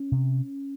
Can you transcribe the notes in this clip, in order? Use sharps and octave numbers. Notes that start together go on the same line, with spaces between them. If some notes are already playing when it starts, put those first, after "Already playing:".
Already playing: C#4
C3